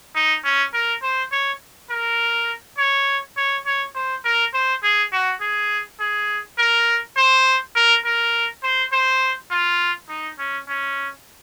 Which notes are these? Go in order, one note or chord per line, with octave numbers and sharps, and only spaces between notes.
D#4
C#4
A#4
C5
C#5
A#4
C#5
C#5
C#5
C5
A#4
C5
G#4
F#4
G#4
G#4
A#4
C5
A#4
A#4
C5
C5
F4
D#4
C#4
C#4